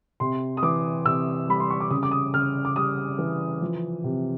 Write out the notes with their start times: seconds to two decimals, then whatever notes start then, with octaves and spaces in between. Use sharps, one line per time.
0.20 C3 C6
0.57 D#6
0.63 E3 D6
1.05 C3 E6
1.48 G3 B5
1.60 C6
1.71 C#6
1.80 D6
1.90 C#3 D#6
2.03 D6
2.11 D#6
2.34 C#3 F6
2.65 D6
2.76 G3 D#6
3.19 E3
3.62 F3
4.04 C3